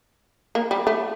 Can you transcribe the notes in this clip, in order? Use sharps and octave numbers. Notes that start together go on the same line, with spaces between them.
A#3
G3
A3